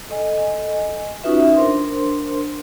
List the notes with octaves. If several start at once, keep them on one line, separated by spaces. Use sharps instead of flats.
A4 D#5 G#5
C#4 D#4 F4 F#4 B4 E5
D4 A#4 C5 C6